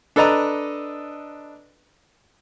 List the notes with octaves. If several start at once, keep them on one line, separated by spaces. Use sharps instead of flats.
D4 A4 B4 D#5 A#5